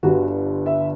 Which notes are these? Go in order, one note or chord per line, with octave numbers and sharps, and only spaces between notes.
G1 G2 D3 F#4
E5